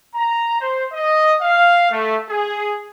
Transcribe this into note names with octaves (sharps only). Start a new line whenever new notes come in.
A#5
C5
D#5
F5
A3
G#4